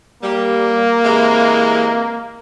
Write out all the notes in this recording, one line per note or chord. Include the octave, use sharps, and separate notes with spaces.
G3 A#3
C3 E3 G#3